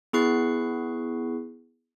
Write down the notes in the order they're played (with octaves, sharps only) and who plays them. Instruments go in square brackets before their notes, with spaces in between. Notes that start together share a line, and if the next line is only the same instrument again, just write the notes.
[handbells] B3 E4 G#4 C#6 F#6 C7